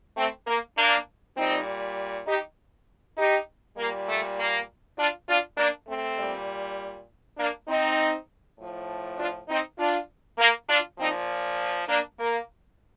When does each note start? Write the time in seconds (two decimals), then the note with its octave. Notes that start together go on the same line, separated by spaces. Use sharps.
0.16 A3 C4
0.46 A#3
0.76 A#3 D4
1.37 A#2 G3 C4 D#4
2.27 D#4 G4
3.17 D#4 G4
3.77 A#2 G3 A#3
4.07 A3
4.37 A#3
4.98 D4 F4
5.28 D4 F4
5.57 A#3 D4
5.88 A3 C4
6.17 A#2 G3
7.38 A#3 D4
7.68 C4 D#4
8.58 A2 F3
9.18 D4 F4
9.48 C4 D#4
9.78 D4 F4
10.39 A#3
10.68 D4 F4
10.99 A#2 F3 C4 D#4
11.88 A#3 D4
12.19 A#3